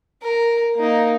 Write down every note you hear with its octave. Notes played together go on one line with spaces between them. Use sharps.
A#4
A#3 D#4